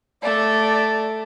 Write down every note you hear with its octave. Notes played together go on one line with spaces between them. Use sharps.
A3 A4 D5